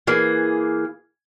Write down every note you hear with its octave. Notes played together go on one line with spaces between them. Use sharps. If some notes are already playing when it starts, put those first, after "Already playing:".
E3 A#3 G#4